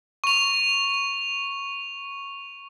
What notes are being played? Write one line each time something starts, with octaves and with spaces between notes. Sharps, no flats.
C#6 F7